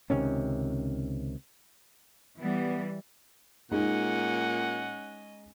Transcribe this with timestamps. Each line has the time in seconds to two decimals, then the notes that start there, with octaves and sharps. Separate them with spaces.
0.10 C#2 C3 D#3 C#4
2.39 E3 G3 B3
3.71 A#2 G#3 C#4 D#4 G#4 D#5 F#5